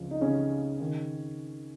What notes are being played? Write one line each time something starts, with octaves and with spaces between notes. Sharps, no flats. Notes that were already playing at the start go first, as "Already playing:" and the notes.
Already playing: C#2 C#3 F3
D#4
C#3 C#4
D#3